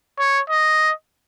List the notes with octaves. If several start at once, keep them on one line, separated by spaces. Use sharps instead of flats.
C#5
D#5